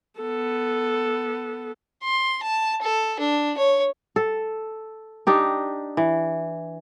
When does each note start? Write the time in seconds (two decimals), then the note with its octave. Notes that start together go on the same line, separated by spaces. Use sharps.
0.19 B3 A4
2.03 C6
2.43 A5
2.82 A4
3.19 D4
3.58 C#5
4.16 A4
5.27 D4 D#4 G4
5.97 E3